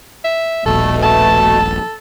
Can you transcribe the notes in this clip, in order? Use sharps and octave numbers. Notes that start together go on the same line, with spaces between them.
E5
D#1 A#1 B2 A3 A4
A4 A5